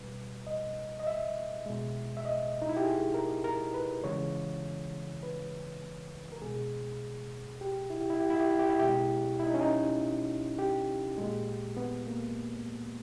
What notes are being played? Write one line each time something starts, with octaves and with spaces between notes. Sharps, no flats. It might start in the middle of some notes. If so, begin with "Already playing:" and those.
Already playing: B2 G3 B4
D#5
D#5
E5
B2 G#3
E5
D#5
D#4
E4
G4
G#4
A#4
A#4
B4
C#3 E3 G#3 C#5
B4
A#4
B2 G#3 G#4
G4
E4
G4
E4
G4
E4
G4
E4
G4
E4
B2 G#3 G4
E4
E4
D#4
C#4
D#4
G4
A#2 G#3
B3
A#3